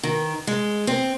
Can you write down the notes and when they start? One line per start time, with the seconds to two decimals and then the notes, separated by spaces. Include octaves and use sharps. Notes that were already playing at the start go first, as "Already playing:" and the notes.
0.03 D#3
0.47 G#3
0.87 C4